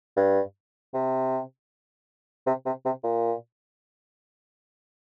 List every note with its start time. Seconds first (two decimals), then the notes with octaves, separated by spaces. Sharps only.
0.16 G2
0.94 C3
2.46 C3
2.65 C3
2.85 C3
3.04 A#2